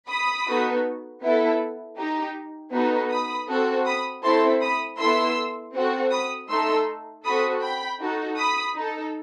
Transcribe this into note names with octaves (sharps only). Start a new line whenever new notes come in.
B5 D#6
B3 D#4 F#4 A4
B3 E4 A4
D#4 G4
B3 D#4 F#4 A4
B5 D#6
C4 F#4 A4
B5 D#6
A3 C4 E4 A4 A5 C6
B5 D#6
B3 E4 A4 C6 E6
C4 F#4 A4
B5 D#6
A3 D#4 A4 C6 E6
C4 F#4 A4 B5 D#6
G5 B5
D#4 F#4 A4
B5 D#6
D#4 A4